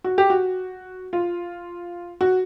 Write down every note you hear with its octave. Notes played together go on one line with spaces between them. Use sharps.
F#4
G4
F#4
F4
F#4